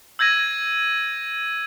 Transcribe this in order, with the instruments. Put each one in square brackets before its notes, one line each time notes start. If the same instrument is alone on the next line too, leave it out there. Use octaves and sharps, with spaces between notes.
[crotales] E6 G6 G#6 A#6 D#7